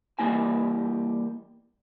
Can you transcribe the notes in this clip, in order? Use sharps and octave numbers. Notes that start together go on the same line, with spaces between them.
E3 G3 A#3 E4 G#5